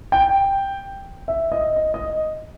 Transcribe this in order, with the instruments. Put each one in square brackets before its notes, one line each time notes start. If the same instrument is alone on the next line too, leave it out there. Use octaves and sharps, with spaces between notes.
[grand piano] G5
E5
D#5
D#5
D#5